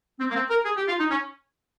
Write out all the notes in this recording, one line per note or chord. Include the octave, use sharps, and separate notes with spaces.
C4
A#3
C4
A#4
G#4
G4
F4
D#4
C#4